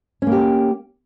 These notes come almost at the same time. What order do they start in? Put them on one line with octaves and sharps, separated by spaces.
C#4 A#3 G4